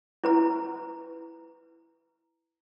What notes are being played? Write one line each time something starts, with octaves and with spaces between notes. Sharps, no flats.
E4 B4 A#5